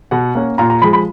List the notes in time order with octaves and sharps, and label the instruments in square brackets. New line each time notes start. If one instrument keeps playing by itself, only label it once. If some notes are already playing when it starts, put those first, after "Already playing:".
[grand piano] B2 F#5
A#3 C#4
A#2 A#5
A#5
F3 G#3 B5
B5